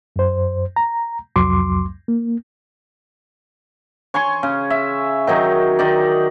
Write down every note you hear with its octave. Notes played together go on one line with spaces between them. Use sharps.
F#2 C5
A#5
C2 F2 F#3 C6 D6
A#3
C#5 G#5 C6 C#6
C#3
E5
D#3 F#3 D#4 C#5
D#3 D#4 D5